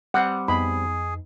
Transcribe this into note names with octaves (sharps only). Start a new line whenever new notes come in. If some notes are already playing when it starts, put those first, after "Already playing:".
G3 C4 F#5
F2 B3 D#4 G#4 B5